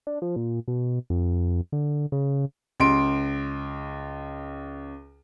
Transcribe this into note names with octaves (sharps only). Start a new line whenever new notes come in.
D4
F3
A#2
B2
F2
D3
C#3
C#2 C6 D7